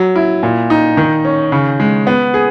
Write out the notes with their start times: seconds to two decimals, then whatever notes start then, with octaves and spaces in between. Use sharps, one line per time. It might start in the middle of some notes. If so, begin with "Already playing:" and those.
Already playing: F#3
0.16 E4
0.43 A#2
0.70 D#4
0.97 D#3
1.25 C#4
1.52 C#3
1.80 G#3
2.07 B3
2.34 G#4